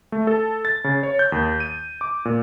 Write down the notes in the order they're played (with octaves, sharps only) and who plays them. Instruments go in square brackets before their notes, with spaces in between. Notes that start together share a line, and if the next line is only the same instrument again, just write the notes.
[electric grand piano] A3
A4
A6
C#3
C#5
G6
D#2
D#7
D6
A#2